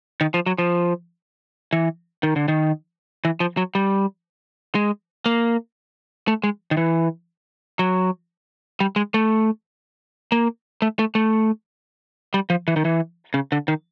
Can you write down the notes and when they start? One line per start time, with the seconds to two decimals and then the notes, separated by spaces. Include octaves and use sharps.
0.21 D#3
0.34 F3
0.46 F#3
0.58 F3
1.73 E3
2.23 D#3
2.36 D3
2.48 D#3
3.25 E3
3.40 F3
3.57 F#3
3.75 G3
4.75 G#3
5.26 A#3
6.28 A3
6.43 G#3
6.71 D#3
6.77 E3
7.79 F#3
8.80 G3
8.96 G#3
9.14 A3
10.32 A#3
10.82 A3
10.99 A3
11.15 A3
12.34 G3
12.50 F3
12.68 E3
12.76 D#3
12.85 E3
13.34 C#3
13.52 D3
13.68 D#3